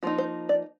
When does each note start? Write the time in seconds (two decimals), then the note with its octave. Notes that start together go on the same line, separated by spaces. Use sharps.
0.03 F3 A#3 D#4 F#4
0.18 C5
0.49 D5